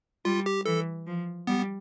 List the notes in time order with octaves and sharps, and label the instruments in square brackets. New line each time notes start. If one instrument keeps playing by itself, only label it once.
[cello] G3 [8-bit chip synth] F4
[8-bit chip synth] G4
[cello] E3 [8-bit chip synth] A4
[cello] F3
[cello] G3 [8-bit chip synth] B3